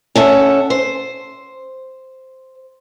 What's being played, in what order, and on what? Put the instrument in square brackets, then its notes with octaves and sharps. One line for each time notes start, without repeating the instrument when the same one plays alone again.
[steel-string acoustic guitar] C#4 A4 E5 F#5
C5